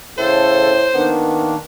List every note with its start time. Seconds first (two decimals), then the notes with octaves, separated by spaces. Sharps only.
0.18 A2 C#3 A4 C5
0.94 D#3 A#3 B3 D4